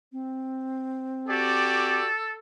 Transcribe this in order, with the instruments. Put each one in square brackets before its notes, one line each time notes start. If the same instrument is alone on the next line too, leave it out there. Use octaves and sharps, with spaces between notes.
[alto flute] C4
[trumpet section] F#4 G4 D5 [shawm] A4